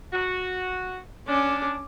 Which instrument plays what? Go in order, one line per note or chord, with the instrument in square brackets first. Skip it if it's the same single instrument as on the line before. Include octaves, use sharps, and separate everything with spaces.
[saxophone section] F#4
[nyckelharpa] C#4 D6 [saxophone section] D4